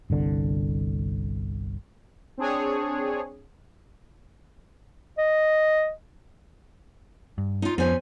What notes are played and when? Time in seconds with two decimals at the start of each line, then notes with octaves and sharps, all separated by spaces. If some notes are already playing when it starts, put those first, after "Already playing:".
0.10 G1 C2 D3
2.37 C4 D4 G#4 C#5
5.18 D#5
7.38 G2
7.62 D#4 F4
7.78 F2 F3 B3 C#4 C5 G#5